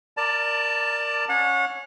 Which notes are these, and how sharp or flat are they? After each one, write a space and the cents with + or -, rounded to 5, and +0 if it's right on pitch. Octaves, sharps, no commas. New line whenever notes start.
A#4 -5 D5 +5 A5 +20
C#4 +0 C#5 +0 F#5 -35